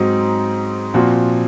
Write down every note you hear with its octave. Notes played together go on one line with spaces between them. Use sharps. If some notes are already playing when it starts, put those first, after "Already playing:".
Already playing: G#2 F#3 C4 D#4 F#4
A#2 F3 C4 F#4